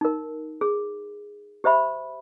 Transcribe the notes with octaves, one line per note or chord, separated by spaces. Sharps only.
D#4 A#4
G#4
G4 C5 E5 B5